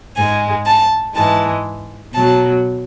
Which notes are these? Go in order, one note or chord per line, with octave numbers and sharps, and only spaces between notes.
G#2 G#3 G#5
A5
G#2 E3 G#3 A5
B2 F#3 A5